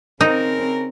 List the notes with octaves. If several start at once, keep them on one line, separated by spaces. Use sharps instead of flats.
C#3 C4 D#4 A#4